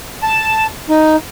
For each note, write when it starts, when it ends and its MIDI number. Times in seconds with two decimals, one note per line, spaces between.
0.22 0.67 81
0.89 1.16 63